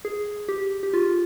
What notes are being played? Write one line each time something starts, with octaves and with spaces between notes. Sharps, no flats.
G#4
G4
G4
F4